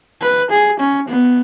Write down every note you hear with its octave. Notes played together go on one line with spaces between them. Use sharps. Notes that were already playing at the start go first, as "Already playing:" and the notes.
B4
G#4
C#4
B3